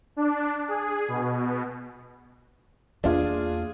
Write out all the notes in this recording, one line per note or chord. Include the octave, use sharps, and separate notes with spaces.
D4
G#4
B2
E2 A#3 D4 F4 G#4